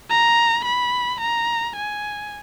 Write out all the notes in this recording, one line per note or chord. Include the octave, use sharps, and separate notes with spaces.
A#5
B5
A#5
G#5